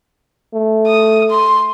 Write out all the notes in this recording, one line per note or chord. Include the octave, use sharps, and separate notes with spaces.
A3
D#6
C6